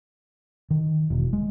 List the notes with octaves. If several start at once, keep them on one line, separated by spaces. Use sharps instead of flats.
D#3
E1
G#3